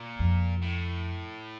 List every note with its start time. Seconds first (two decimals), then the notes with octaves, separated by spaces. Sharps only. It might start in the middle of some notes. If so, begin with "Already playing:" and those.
Already playing: A#2
0.19 F2
0.62 A2